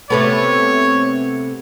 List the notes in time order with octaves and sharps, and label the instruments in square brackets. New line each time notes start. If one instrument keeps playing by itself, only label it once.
[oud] C3 A3 B3 [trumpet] C#5